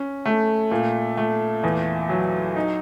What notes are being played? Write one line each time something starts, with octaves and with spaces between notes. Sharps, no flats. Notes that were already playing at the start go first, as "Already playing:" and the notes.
Already playing: C#4
A3
A#2
A3
E2
F#3
D#4